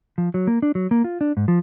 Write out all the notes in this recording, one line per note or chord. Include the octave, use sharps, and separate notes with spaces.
F3
F#3
A#3
D4
F#3
A#3
F4
D4
G#2
F3